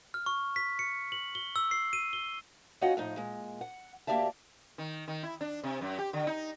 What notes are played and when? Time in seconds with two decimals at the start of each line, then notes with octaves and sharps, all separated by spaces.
0.14 F6
0.26 C#6
0.56 B6
0.79 C#7
1.12 F#7
1.35 G7
1.56 E6
1.71 C7
1.93 D#7
2.13 G7
2.81 C#4 D#4 F4 F#4 D#5 F#5
2.97 A2 F3 D#4
3.17 A#2 G#3
3.61 F#5
4.07 D2 A#3 G4 D5 E5 A5
4.78 D#3
5.08 D#3
5.23 E4
5.41 D4
5.63 C3
5.81 F#2
5.98 G4
6.13 D3
6.27 D#4